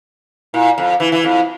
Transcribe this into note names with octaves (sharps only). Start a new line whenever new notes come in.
A#2 E4
F2
E3 E4
E3
F2